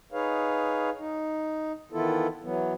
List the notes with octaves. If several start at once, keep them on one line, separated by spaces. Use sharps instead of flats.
D#4 G#4 B4 C#5 F5
D#4
D#3 E3 B3 E4 F4 A4
E3 F#3 B3